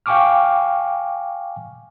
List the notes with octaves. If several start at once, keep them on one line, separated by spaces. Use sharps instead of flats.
F5 G5 G#5 C#6 D6 F6